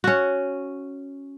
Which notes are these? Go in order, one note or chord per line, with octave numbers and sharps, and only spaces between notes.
C#4 F#4